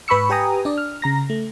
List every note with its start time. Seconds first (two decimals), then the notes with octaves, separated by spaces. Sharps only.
0.08 G#2 B4 B5 C#6 E6 C#7
0.30 G4 B4 G5 G#5 A#5 D#6
0.65 D4 D5
0.78 F6
1.02 C#3 A#5 A#6
1.30 A3